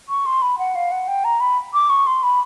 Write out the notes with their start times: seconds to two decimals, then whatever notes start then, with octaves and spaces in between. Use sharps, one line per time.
0.09 C#6
0.26 C6
0.42 B5
0.58 F#5
0.75 F5
0.91 F#5
1.08 G5
1.24 A#5
1.40 B5
1.74 D6
1.90 C#6
2.07 C6
2.23 B5